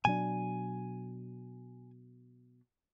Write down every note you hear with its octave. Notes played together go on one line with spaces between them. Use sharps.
B2 F#3 D4 G#5